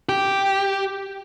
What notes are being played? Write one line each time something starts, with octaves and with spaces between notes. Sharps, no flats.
G4